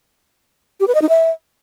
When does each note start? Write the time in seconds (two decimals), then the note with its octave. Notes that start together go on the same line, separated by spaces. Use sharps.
0.80 G4
0.87 B4
0.95 D#5
1.02 D#4
1.09 E5